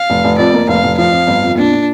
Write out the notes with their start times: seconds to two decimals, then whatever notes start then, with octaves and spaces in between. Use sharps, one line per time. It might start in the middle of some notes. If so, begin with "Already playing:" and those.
Already playing: F5
0.10 F1
0.24 F1
0.38 F2 D5
0.54 A#3
0.68 F1 F5
0.84 F1
0.98 F3 F5
1.12 F2
1.27 G1
1.42 F2
1.57 A#2 D4
1.72 A#2